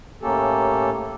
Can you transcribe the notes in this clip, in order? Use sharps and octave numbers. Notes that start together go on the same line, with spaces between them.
A2 A#3 C#4 G4 A4